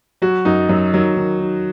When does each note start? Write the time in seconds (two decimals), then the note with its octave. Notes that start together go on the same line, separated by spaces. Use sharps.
0.22 F#3 F#4
0.45 F#2 D#4
0.69 F#2 F#3
0.93 D#3 F#3
1.17 D#3
1.41 D#3